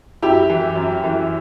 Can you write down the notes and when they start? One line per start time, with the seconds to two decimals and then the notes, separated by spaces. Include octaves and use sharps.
0.22 F#2 E4 G4
0.49 E3
0.76 F#2
1.04 E3